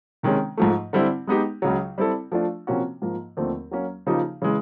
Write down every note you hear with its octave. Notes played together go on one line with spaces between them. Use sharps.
C3 D#3 G#3 C#4
G#2 F3 A3
D3 G3 C4 E4
G#3 B3 D#4 G4
C#2 C#3 F#3
G3 C4 E4 A4
F3 A3 D4 F4
C3 F3 A#3 C#4 F#4
G#2 F3 A#3
D#2 D3 F3 A3 C4
F#3 A#3 C#4
C#3 F3 A#3 D#4 G4
C#3 E3 G#3